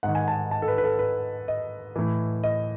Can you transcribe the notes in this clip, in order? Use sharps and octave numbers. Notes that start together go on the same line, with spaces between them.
G#2 D#3 F#5
G#5
A5
A5
A4
B4
B4
A4
B4
D#5
A2 E3
D#5